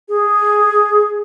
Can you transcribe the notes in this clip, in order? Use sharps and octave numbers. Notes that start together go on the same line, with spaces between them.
G#4